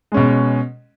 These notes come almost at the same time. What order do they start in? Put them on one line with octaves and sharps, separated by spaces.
G#3 C#4 B2